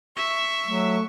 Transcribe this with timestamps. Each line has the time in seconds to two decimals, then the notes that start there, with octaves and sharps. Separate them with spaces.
0.17 E5 C#6
0.67 F#3 A3